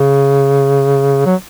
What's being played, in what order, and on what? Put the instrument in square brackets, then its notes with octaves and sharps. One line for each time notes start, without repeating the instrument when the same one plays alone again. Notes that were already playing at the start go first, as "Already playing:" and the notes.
Already playing: [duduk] C#3
F#3